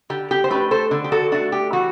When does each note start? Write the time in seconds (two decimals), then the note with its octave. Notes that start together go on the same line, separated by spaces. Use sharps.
0.10 D3 G4
0.31 G4
0.44 C5
0.50 A3 D4 G4 B4
0.71 A4 C5
0.91 D3
1.04 G4
1.12 F#4 A4
1.32 A3 D4 F#4
1.52 G4
1.73 E3 F#4